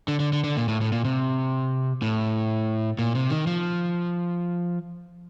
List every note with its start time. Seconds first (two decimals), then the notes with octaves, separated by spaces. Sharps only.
0.08 D3
0.20 D3
0.33 D3
0.44 D3
0.57 A#2
0.68 A2
0.81 A2
0.92 A#2
1.05 C3
2.02 A2
2.99 A#2
3.15 C3
3.30 D#3
3.47 F3